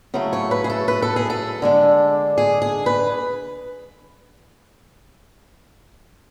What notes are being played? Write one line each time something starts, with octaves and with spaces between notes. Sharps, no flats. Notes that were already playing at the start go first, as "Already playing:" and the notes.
C#3 F#3 A3 E4
C#5
B4
G#4
A4
B4
A4
G#4
A4
D3 G#3 D4
G#4
G#4
B4